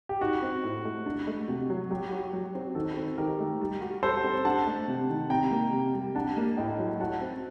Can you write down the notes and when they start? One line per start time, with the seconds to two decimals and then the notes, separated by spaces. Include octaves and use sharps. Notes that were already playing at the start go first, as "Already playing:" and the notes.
0.09 G4
0.21 D#4 F#4
0.42 C4
0.63 A2
0.85 A3
1.06 D4
1.27 A3
1.48 C3 F#4
1.70 F#3
1.90 F#3 G4
2.12 F#4
2.33 F#3
2.55 C4
2.75 D#3 F#4 A4
2.97 C4
3.18 D#3 G4 A#4
3.39 A3
3.61 G3
3.81 F#4
4.03 G3 A4 C5
4.24 C4
4.45 D4 F#5 A5
4.66 A3
4.88 C3
5.10 D#3
5.30 C3 G5 A#5
5.51 A#3
5.73 C3
5.94 G3
6.15 D4 F#5 A5
6.37 A#3
6.57 A2 D#5 G5
6.79 F#3
7.00 F#4 F#5 A5
7.21 C4